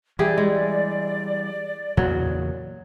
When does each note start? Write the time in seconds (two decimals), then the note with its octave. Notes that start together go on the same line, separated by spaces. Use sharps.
0.19 E3 G3 E4 G4 G#4 D5
0.38 G#3
1.97 E2 A#2 C#3 F#3